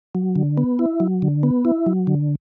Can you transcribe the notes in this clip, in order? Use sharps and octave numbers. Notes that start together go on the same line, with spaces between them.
F#3
D3
B3
E4
F#3
D3
B3
E4
F#3
D3